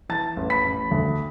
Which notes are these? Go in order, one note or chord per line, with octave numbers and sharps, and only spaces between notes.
E3 A5 A6
A1
B5 B6
A1
D2